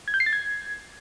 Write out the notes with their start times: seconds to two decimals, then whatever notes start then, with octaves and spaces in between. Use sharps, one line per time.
0.08 G#6
0.14 G6
0.20 C7
0.26 A6
0.33 G#6